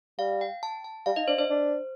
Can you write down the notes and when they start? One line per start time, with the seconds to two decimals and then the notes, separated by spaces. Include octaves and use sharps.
0.19 G3 F5
0.41 G5
0.63 A5
0.84 A5
1.06 G3 F5
1.16 D#4 D#5
1.28 D4 C5
1.38 D4 C5
1.50 D4